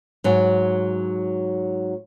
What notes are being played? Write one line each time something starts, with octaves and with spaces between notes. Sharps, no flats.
G#2 F#3